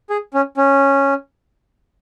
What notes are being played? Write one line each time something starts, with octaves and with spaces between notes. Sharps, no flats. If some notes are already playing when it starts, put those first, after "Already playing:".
G#4
C#4
C#4